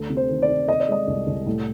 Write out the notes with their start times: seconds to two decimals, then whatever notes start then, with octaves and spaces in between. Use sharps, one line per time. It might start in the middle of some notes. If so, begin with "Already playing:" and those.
Already playing: D2
0.10 C3
0.17 C5
0.29 D#3
0.42 D5
0.49 C3
0.68 C3 D#5
0.80 D5
0.88 G#3 D#5
1.08 C2
1.27 C2
1.46 A2